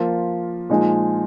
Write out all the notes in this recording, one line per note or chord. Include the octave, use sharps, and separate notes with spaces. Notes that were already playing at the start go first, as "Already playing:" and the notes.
Already playing: F3 A#3 F4
A#2 F3 G#3 D#4 G#4